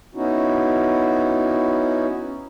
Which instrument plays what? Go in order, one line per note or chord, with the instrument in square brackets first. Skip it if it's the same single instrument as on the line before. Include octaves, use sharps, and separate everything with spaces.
[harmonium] B3 C#4 D#4 E4 F#4